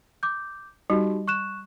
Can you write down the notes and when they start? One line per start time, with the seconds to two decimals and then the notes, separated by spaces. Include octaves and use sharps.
0.23 D6 G6
0.90 G3 D#4 F#4 G4
1.28 C#6 F#6 E7